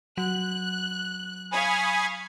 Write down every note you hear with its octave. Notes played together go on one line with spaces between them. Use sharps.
F#3 F#6
F5 G#5 B5 C#6 D#6